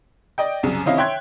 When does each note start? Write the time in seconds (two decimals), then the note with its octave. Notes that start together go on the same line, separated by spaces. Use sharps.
0.38 D5 D#5 G5
0.63 C2 F#2 C#3
0.86 C3 D#3 C#4 E4 D#5 F5
0.97 C#5 E5 G5 C6 F#6 G#6